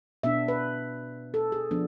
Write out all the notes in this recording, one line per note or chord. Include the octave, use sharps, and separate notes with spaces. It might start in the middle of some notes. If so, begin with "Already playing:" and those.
B2 B3 D4 E5
B4
A4
G#4
F3 B3 D4